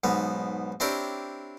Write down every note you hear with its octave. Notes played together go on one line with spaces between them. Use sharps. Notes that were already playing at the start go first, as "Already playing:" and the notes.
B1 G#2 B3
C4 D4 E4 G4 A#4 C#5